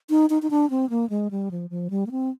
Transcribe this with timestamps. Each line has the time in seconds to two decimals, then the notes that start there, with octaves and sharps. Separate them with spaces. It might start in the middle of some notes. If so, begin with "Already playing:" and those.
0.10 D#4
0.30 D#4
0.42 D#4
0.50 D4
0.70 C4
0.90 A#3
1.10 G#3
1.31 G3
1.51 F3
1.70 F3
1.90 G3
2.07 A#3
2.11 C4